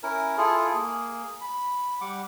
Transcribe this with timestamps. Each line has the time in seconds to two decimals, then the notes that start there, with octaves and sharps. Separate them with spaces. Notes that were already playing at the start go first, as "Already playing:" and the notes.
0.03 C#4 E4 A#4
0.38 E4 F4 G#4 A4
0.73 A#3 G#4
1.41 B5
2.01 G3 F#5 D6